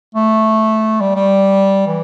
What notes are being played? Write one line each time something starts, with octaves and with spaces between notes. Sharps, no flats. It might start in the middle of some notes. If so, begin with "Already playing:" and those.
A3
G3
G3
E3